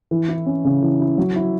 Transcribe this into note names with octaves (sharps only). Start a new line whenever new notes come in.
E3
E4
C#4
C#3
E3
E4
F#3
E4